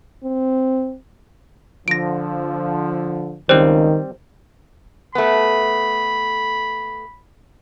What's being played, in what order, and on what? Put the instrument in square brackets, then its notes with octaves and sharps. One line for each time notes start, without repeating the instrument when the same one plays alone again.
[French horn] C4
[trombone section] D3 F3 [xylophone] A#6 D7
[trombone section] C#2 [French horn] D#3 [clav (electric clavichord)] G3 C4 [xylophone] C5
[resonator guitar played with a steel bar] A3 B3 [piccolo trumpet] B5